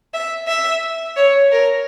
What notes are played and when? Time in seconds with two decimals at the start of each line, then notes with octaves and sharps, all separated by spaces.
0.14 E5
0.48 E5
1.17 C#5
1.52 A#4